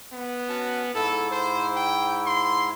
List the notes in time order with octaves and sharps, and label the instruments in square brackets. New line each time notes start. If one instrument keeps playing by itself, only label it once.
[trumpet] B3
[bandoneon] C#4 F#4 A5
[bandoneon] G#2 E4 [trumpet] A4
[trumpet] C5
G5
C6